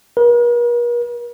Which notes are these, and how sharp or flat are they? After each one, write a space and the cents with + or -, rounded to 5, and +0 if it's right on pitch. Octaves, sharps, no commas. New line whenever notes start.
A#4 +45